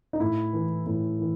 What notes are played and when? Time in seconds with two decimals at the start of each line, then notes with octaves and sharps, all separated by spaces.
0.13 D#4
0.20 A2 E4
0.53 E3
0.86 A2 E4
1.19 E3